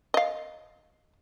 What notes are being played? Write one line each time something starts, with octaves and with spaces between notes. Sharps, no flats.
D#5 F5